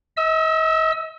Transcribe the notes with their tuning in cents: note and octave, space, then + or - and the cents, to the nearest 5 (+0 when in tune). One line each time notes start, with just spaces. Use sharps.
D#5 +40 E6 +0